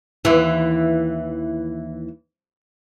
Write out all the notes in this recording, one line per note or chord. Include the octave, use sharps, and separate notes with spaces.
D#2 E3